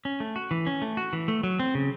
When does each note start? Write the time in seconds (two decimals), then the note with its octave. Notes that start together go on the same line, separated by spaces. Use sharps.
0.05 C#4
0.20 A3
0.36 F#4
0.51 E3
0.67 C#4
0.82 A3
0.97 F#4
1.13 E3
1.28 A3
1.43 F#3
1.59 C4
1.75 C#3